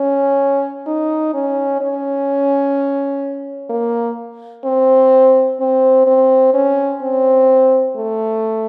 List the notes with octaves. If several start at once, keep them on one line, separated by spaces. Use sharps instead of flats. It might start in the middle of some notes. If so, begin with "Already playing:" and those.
Already playing: C#4
D#4
C#4
C#4
A#3
C4
C4
C4
C#4
C4
A3